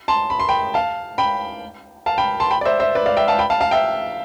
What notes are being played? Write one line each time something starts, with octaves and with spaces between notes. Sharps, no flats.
A5 C6
B5
C6
G5 B5
F5 A5
G5 B5
F5 A5
G5 B5
A5 C6
G5 B5
D5
C5 E5
C5 E5
B4 D5
D5 F5
E5 G5
F5 A5
G5 B5
F5 A5
F5 A5
E5 G5